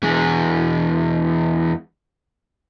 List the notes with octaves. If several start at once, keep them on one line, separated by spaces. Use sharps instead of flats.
E2 G#3